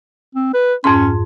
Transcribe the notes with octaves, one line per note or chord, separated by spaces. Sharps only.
C4
B4
F2 G#2 C#4 C6